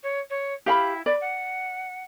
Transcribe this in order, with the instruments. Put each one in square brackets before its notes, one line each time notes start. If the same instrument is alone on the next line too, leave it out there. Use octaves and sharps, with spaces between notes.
[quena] C#5
C#5
[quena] E4 [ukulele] G4 F5 B5
[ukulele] D5 [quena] B5
[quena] F#5